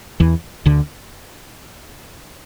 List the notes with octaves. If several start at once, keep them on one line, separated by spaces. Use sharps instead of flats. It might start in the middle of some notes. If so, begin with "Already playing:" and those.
E2 E3
D2 D3